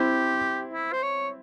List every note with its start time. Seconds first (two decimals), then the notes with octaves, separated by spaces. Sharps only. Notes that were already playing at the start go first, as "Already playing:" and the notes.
Already playing: C4 E4 G4
0.73 E4
0.93 C5
1.03 C#5